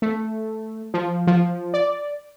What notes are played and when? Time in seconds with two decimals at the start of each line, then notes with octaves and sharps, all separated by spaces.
0.02 A3
0.94 F3
1.27 F3
1.74 D5